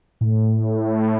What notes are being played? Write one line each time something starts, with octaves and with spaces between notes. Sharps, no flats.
A2